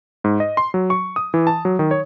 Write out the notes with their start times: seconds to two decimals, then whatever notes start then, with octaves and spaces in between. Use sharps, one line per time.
0.24 G#2
0.40 D#5
0.57 C6
0.74 F#3
0.90 C#6
1.16 D#6
1.34 E3
1.47 A5
1.65 F#3
1.79 D#3
1.91 C#5